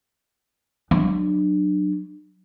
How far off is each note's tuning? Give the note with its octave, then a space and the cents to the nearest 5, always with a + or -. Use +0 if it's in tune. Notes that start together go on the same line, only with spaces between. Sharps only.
F#3 +0 D4 +30